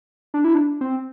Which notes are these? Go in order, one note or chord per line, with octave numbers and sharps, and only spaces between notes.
D4
E4
D4
C4